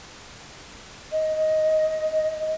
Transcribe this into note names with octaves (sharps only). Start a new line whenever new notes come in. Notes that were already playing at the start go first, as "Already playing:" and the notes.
D#5